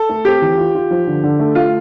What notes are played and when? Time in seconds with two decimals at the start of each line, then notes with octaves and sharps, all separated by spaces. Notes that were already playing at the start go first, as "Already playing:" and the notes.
Already playing: A4
0.09 A3
0.25 C4 G4
0.42 E3
0.57 F4
0.75 F4
0.91 F3
1.07 D3
1.24 D3
1.39 A3
1.55 A3 F4